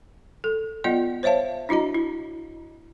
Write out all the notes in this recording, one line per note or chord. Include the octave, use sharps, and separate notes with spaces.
A4
B3 F4 D5 D#5 F#5
C5 C#5 E5 F5 A5
D4 E4 F#4 D#5 A#5
E4